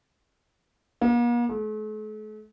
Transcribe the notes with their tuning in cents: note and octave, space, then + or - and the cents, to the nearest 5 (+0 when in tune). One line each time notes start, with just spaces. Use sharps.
A#3 +45
A3 -45